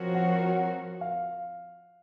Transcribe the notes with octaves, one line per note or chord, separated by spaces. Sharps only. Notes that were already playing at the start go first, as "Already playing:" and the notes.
Already playing: F3 C4 F#4 A#4 C#5
F#5
F#5
F5